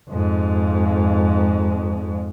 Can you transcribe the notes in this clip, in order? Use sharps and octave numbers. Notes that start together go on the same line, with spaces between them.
F2 G#2